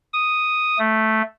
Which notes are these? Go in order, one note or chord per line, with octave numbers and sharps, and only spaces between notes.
D#6
A3